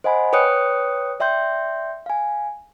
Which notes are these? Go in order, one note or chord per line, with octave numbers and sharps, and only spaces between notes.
C5 D#5 F#5 G#5 B5
B4 C#5 G5 D#6 F#6 C#7
D5 E5 G5 C6 G6
F5 G#5